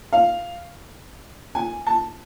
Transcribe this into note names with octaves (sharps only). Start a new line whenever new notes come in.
F5
G#5
A5